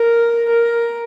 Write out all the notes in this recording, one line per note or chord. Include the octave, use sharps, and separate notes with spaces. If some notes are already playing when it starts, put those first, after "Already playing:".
Already playing: A#4
A#4